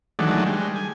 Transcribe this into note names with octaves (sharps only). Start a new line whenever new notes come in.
D#3 E3 F#3 G#3 A3 D4
G3 G#3
G#5